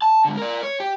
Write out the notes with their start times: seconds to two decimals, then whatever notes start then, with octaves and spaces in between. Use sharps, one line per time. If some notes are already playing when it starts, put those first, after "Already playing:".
0.02 A5
0.25 G#2 D3
0.37 A#4 D5
0.63 C#5
0.80 G4